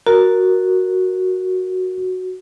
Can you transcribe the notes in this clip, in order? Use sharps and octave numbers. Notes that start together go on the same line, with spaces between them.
F#4 A#4